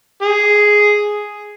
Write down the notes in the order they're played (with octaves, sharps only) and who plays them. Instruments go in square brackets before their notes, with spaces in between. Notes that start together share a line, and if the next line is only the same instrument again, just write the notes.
[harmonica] G#4